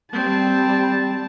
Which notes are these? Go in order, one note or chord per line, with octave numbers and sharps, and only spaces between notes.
G3 C4 A5